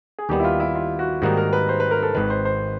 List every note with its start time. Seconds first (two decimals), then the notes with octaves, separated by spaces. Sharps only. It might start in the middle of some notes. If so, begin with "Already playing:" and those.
0.19 G#4
0.29 D#2 D#3 G3 B3 G4
0.40 E4
0.44 F4
0.60 E4
0.75 F4
0.99 F#4
1.22 G#2 D#3 G3 A#3 D#4 F#4
1.37 A#4
1.53 B4
1.69 C5
1.80 B4
1.91 A#4
2.03 A4
2.15 G#1 G#2 D#3 B4
2.30 C5
2.45 C5